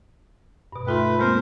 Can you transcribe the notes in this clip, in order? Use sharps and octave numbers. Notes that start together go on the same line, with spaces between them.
G2 B2
D#2 A3 F4 B4 C6
G#3 A#3 C4 A#4 C5